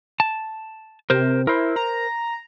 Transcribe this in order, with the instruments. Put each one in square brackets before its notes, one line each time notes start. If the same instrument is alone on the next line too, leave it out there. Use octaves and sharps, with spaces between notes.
[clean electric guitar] A5
[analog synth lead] C3 [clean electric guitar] A#4 C5
[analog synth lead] E4 [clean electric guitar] A#4 C5
[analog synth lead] A#5